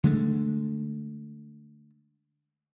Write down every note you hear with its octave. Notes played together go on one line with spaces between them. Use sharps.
D3 G#3 A3